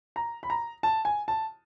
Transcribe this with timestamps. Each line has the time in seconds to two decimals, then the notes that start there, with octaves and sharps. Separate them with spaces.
0.16 A#5
0.43 B5
0.50 A#5
0.83 A5
1.05 G#5
1.28 A5